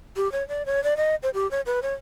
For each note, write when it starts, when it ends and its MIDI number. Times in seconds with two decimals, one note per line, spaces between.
0.17 0.31 67
0.32 0.46 73
0.49 0.66 74
0.66 0.83 73
0.84 0.97 74
0.97 1.15 75
1.23 1.30 72
1.34 1.50 67
1.51 1.61 73
1.66 1.80 71
1.83 1.93 73